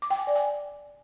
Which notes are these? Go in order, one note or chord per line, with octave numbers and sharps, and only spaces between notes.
D6
G5
G#5
D5
G#5